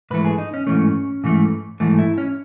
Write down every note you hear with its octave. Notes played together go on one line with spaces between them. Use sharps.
G#2 E3 A3 B4
G#4
D#4
C#4
G#2 E3 A3 C#4
G#2 E3 A3
G#2 E3 A3
E4
C#4